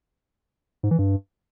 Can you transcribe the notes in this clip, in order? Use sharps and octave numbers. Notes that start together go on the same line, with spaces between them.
G#2
E3
G2